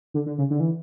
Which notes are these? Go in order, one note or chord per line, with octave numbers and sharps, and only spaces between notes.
D3
D3
C#3
D3
E3